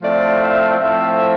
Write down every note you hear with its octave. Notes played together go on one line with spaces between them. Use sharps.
A2 F3 A3 C4 D5
E5
A2 F3 A3 C4